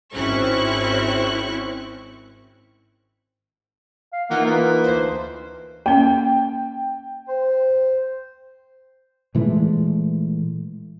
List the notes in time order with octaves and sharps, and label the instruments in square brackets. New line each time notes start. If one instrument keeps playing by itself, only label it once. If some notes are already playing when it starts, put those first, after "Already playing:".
[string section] G#1 C4 C#4 E4 C#6 F#6
[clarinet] F5
[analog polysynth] E3 D#4 F4 [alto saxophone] A#3 [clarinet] F#5
[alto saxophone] A#3 [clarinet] B4
[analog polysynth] D2 C5
[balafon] A#3 C#4 [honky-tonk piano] G5
[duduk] C5
[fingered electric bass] A#2 E3 G#3 A3